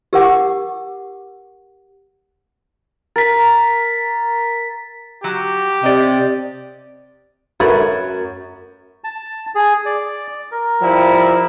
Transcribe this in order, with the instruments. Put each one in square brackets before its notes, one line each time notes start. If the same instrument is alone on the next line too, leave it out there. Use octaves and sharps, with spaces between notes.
[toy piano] G4 A#4 F#5 D6
[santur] A#4 [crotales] A6 B6
[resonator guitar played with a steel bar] F#3 [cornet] G4
[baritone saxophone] C3 [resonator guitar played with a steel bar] D5 D#5
[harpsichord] F#2 [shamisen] A3 B4
[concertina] A5
G#4
D5
A#4
[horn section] F3 G3 E4